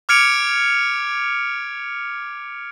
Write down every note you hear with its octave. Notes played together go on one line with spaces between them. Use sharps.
D6 F6 G#6 C#7 D7 F7